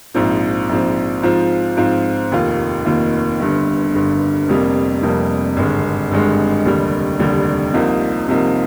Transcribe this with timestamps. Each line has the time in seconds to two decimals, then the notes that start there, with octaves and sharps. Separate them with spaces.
0.14 A#1 G#2 F3 C4
0.69 A#1 G#2 F3 C4
1.23 G#2 F3 C4 F4
1.77 G#2 F3 C4 F4
2.32 F1 D#2 D#3 A#3 F4
2.85 F1 D#2 D#3 A#3 F4
3.40 G1 G2 D3
3.94 G1 G2 D3
4.48 F1 F2 C3 G3 A#3
5.02 F1 F2 C3 G3 A#3
5.57 G#1 G2 D3 G#3
6.11 G#1 G2 D3 G#3
6.65 F1 D#2 D3 G3
7.20 F1 D#2 D3 G3
7.74 C2 C3 F3 A#3 D#4
8.28 C2 C3 F3 A#3 D#4